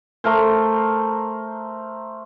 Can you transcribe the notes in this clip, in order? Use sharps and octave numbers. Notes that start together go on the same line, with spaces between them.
A3 A#4 C5